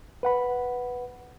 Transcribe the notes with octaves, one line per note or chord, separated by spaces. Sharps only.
B4 F#5 B5